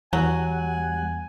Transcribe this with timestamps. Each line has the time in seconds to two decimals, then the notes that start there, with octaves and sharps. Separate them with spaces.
0.13 E2 F#3 G3 F#5 G#5